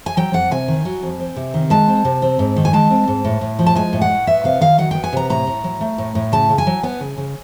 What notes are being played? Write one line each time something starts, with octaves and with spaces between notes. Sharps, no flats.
G#5
F#3 G5
F2 F#5
C3 G#5
D#3
F#3
F2
C4
C3
D#3
G#3 A5
C4
C3
C4
G#2
D#3
G#5
G#3 A5
C4
G#2
A2
A2
F3
A5
G#3 G#5
A2
F#5
A2
B3 E5
C3 F5
D#3 F5
F#3 F#5
B3 G5
G#5
C3 A#5
A2 A#5
A2
F#3
A3
A2
A2
C#3 A5
C#3
G#5
F#3
B3 G#5
C#3
C#3